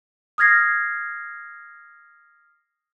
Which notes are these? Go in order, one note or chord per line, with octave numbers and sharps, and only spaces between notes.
D#6 F6 G#6 A#6 C7